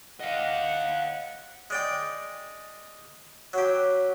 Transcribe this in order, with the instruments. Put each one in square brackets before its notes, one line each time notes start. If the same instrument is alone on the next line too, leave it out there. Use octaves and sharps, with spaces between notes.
[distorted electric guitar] D#5 F5 [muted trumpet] F#5
[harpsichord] G#3 D5 G5
F#3 G4